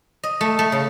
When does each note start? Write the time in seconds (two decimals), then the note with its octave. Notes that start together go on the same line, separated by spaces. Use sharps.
0.24 D#5
0.41 A3
0.59 A3
0.72 C#3